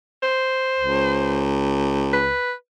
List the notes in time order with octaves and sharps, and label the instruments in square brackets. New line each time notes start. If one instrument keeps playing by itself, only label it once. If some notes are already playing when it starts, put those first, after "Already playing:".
[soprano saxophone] C5
[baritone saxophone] C#2
[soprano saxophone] B4